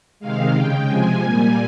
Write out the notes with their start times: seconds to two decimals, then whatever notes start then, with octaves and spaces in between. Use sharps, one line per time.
0.20 C3 D#3 G#3 F5
0.54 C#3 G#3 G5
0.87 C3 F3 G#3 G#5
1.22 A#2 G3 A#3